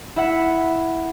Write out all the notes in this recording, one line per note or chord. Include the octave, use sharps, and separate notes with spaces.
E4 E5 F#5